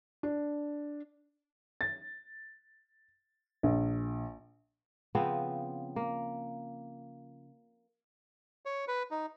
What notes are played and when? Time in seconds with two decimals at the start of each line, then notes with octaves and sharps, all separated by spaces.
0.23 D4
1.81 A6
3.63 A#1
5.15 C#3 F3 B3 C4
5.96 A#3
8.65 C#5
8.88 B4
9.11 D#4